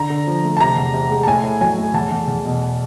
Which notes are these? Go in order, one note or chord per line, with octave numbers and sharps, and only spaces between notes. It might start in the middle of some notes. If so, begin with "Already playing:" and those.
Already playing: D3 A#5
D3
F3
A3
A5
C3 A#5
E2
C3
G#3
A5
A2 G#5
A2
F#3 G#5
A3
E2 A5
E2
E2
B2